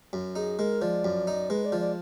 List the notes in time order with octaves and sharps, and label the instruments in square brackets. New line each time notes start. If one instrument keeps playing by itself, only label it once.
[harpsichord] F#2
[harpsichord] D#4 [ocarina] G#4
[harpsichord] G#3 [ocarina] A#4
[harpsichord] F3 [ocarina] D5
[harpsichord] F#2
D#4
[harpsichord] G#3 [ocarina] B4
[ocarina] D5
[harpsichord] F3
[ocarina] D5